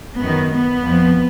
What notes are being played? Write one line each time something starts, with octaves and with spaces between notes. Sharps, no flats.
F#2 D#3 B3
B3
F2 F3